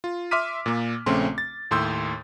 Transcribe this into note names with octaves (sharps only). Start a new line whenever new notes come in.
F4
E5 C6 D6 F6 B6 D#7
A#2 A#3
A#1 C#3 A3 C4 C#4 C6
A6
D#2 A2 C6 E6 G6